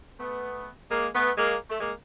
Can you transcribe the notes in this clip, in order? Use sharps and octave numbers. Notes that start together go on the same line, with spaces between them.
A3 B3
G#3 A#3
A3 B3
G#3 A#3
A3
G#3 A#3